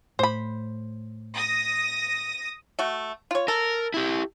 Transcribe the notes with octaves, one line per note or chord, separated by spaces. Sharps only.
A2 C5 B5
D#6 A#6
A3 F#4
F4 C#5
A4 A#4
E4 G4